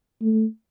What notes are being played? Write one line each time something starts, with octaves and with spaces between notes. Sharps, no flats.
A3